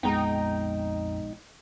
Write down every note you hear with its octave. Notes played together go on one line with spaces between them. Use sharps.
A#1 F2 G#3 B3 D#4 G5 A#5